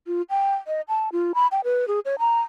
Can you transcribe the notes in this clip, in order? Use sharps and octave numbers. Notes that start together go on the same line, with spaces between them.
F4
G5
D#5
A5
F4
B5
G5
B4
G#4
C#5
A#5